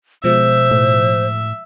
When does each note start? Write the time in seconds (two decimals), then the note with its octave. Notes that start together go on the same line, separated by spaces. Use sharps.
0.24 B2 F3 G#3 C5 E5
0.71 A2